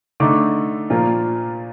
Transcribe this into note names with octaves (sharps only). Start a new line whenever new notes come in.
D3 A3 D#4 D6
A#2 F3 A#3 F4